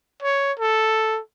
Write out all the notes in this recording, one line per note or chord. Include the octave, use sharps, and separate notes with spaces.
C#5
A4